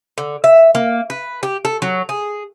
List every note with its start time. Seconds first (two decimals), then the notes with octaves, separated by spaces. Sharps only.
0.18 D3
0.44 E5
0.75 A#3
1.10 B4
1.43 G4
1.65 A4
1.82 F#3
2.09 G#4